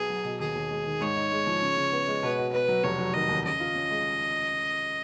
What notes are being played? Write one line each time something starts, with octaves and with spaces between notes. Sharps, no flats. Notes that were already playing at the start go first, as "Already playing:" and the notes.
Already playing: B1 B3 G#4
F#3
B2
D#2 G#4
D#2
G#3
D#3
G#2 C#5
D#4
G#3
F3
C#3
C#3
B3
G#3
B2 B4
F#4
B3 B4
F#3
F1 C#5
F#3
D#3 D#5
D#2
C#3 D#5
F4
C#4
G#3